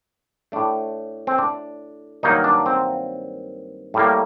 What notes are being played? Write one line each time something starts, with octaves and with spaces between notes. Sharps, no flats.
A2 A3 D4
C4
D4
G2 D#3 F#3 A#3 D#4
D4
C4
A2 G3 A#3